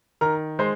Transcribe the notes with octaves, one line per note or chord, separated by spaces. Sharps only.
D#3 A#4 A#5
G#3 C5 C6